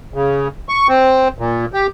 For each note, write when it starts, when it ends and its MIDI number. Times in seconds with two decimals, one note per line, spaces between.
0.14 0.48 49
0.69 0.87 85
0.88 1.28 60
1.38 1.65 46
1.73 1.87 67